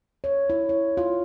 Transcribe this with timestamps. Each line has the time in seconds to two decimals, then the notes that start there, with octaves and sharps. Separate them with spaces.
0.24 C#5
0.50 E4
0.69 C#5
0.97 F4